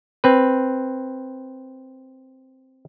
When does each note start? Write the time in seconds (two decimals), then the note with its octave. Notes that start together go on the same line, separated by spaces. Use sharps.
0.24 C4 B4